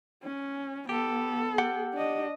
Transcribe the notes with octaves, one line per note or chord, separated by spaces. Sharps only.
C#4
B3 G4 A4
G4 F#5 G5
D4 D#5